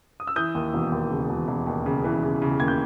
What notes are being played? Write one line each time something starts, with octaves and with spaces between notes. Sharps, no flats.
D#6
E6
E3 D#6 G6
D#2
E1
D#2
C#3
E1
E1
D#2
C#3
E3
C#3
C#3
D#2 G#6
G6